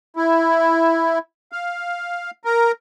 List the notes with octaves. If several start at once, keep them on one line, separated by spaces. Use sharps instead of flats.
E4
F5
A#4